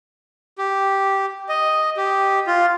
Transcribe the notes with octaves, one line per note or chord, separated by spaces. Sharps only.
G4
D#5
G4
F4